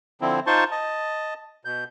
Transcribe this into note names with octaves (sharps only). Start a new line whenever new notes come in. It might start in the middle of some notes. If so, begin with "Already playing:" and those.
D3 F3 C4 E4
D#4 F4 C5 A5 C6 C#6
D#5 A5
B2 G6